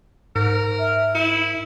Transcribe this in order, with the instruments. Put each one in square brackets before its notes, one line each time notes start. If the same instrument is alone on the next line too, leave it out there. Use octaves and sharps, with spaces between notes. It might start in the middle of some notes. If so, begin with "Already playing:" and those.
[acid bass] G#2 [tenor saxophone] A#4
[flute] E5
[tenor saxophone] E4